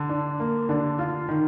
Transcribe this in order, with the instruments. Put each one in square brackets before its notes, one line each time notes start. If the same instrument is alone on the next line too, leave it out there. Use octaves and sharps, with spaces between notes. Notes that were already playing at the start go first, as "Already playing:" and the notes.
Already playing: [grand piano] D3
[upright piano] D4
A#3
[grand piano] D3 [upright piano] D4
[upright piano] F4
D#3